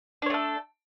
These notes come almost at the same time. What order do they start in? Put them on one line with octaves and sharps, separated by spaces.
D4 C#5 A3 A4